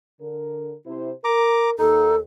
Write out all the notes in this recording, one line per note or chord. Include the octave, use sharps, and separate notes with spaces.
D3 A#4
C3 E4 C5
A#4 A#5 D6
D#2 D#4 A4